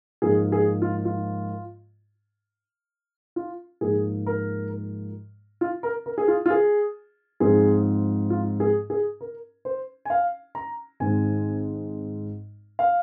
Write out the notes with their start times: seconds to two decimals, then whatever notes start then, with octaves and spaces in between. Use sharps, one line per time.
0.22 G#2 F3 A#3 G#4
0.52 G#4
0.82 F4
1.05 F4
3.36 F4
3.81 G#2 F3 A#3 G#4
4.26 A#4
5.61 F4
5.83 A#4
6.06 A#4
6.18 G#4
6.28 F4
6.46 F4
6.50 G#4
7.40 G#2 F3 C4 G#4
8.30 F4
8.60 G#4
8.90 G#4
9.21 A#4
9.65 C5
10.05 G#5
10.10 F5
10.55 A#5
11.00 G#1 G#2 G#3 C4 G#5
12.79 F5